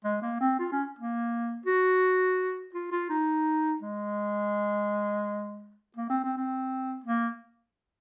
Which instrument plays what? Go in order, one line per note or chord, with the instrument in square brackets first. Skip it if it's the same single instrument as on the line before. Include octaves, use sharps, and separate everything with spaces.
[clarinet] G#3
A#3
C4
F4
C#4
A#3
F#4
F4
F4
D#4
G#3
A#3
C4
C4
C4
A#3